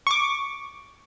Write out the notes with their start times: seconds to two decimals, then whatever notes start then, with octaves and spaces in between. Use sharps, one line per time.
0.07 C#6 D6